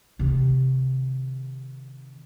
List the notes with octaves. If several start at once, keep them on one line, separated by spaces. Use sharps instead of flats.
C3 D#3